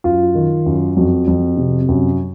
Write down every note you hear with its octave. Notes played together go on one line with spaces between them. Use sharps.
F#2 F4
D#3
F#2
F2 F#4
F2
C3
F#2